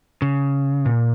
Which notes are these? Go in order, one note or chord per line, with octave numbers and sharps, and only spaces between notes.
C#3
A#2